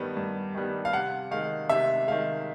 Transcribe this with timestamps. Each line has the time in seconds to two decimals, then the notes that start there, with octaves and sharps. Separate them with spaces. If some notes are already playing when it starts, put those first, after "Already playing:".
Already playing: G2 D#3 G3 B3
0.17 G2
0.55 D#3 G3 B3
0.85 F5
0.93 C3 F#5
1.31 D#3 G#3 F5
1.69 C3 E5
2.08 D#3 G#3 F5